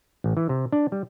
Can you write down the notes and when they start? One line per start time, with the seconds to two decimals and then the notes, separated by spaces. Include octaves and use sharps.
0.24 A1
0.37 E3
0.49 C3
0.72 D4
0.92 G3